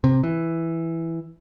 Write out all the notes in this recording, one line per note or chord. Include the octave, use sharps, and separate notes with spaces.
C3
E3